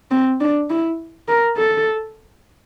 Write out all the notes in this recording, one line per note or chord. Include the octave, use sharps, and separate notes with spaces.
C4
D4
E4
A#4
A4